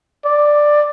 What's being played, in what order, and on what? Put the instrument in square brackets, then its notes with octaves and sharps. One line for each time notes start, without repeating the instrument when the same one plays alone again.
[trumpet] D5